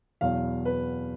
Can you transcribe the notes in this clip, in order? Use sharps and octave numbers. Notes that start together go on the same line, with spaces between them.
E2 B2 F#3 F5
B4